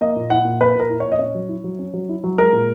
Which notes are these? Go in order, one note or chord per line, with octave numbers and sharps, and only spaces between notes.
A#3 D#5
A#2
E4 F#5
A#2
A#3 B4
A#2 A#4
E4
A#2 C#5
D#5
C#4 C#5
F#3
E4
F#3
C#4
F#3
E4
F#3
G#3 A#4
A#2